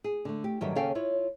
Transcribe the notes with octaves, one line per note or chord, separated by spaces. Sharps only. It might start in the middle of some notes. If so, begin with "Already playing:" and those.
G#4
D3 A3
G4
G2 D#3 F#3 G4 A4 E5
D#2 C#3 C#4 A4 F5 G5
E4 F4 C#5